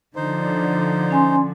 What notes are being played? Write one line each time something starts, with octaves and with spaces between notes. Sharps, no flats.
D3 F3 D#4 C5
C#4 G#5 C6